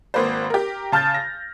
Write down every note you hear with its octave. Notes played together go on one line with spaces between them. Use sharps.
G#1 A#3 B4 C5
G4 A#4
C#3 A5 F6 G6 A6
A#6